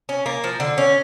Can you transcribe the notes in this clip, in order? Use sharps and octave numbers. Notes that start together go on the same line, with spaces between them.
C#4
A#3
F3
D3
C#4